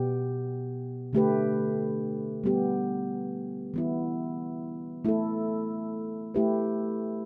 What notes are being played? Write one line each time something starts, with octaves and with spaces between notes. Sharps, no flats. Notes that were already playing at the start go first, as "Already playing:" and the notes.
Already playing: B2 B3 G4
D3 A3 G4 B4
G3 B3 G4
E3 B3 E4
A3 E4 A4
A3 E4 G4 B4